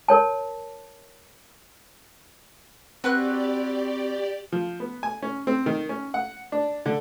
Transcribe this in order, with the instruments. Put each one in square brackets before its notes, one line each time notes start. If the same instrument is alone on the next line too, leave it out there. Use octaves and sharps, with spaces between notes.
[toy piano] A#4 C#5 A5
[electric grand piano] C4 [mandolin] F#4 B4 F#6 [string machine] G4 D5
[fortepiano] F3
B3
G#5
C#4
C4
D#3
C#4
F#5
D4
D3